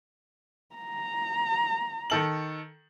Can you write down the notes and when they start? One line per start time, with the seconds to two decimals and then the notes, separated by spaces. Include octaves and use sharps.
0.75 A#5
2.10 D#3 A4 F#7